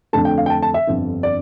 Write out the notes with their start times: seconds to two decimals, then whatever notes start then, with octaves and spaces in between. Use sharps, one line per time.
0.13 F2 D3 A3 D4 A5
0.25 G5
0.38 F5
0.46 G5
0.50 A5
0.62 A5
0.74 E5
0.87 G1 F2 D3
1.23 D5